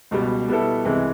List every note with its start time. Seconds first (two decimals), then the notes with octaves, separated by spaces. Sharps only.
0.11 C#2 B2 G3
0.48 B2 G3 B3 E4 A4
0.85 C2 C3 E3 G#3